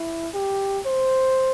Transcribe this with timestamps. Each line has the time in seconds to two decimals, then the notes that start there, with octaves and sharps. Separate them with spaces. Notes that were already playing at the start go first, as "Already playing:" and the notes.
Already playing: E4
0.34 G4
0.86 C5